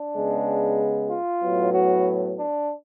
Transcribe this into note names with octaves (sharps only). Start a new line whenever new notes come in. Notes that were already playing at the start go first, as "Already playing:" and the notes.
Already playing: D4
C#3 G#3 B3
F4
A2 F#3 B3
F#4
D4